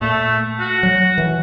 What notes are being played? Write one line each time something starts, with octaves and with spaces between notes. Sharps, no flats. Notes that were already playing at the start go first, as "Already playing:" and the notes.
A#2 A3
F#4
F#3
E3